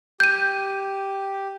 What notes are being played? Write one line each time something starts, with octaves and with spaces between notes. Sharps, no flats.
G4 G6 D#7